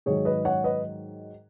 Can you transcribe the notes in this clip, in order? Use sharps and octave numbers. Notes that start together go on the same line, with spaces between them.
G#2 D#3 F#3 G#4 C#5
B4 D#5
C#5 F#5
B4 D#5